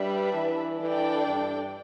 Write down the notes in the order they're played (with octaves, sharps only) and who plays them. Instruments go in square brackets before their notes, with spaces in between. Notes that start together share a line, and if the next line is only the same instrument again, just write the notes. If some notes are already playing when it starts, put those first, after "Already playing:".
Already playing: [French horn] G3 [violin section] D4 B4 E5
[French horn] E3
[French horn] E3 [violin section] D4 A4 D5 G5
[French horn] G2